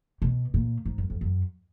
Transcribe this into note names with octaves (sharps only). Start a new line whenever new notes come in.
B2
A#2
G#2
F#2
F2
F#2